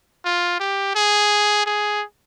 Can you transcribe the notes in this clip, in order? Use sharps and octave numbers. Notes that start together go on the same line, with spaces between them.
F4
G4
G#4
G#4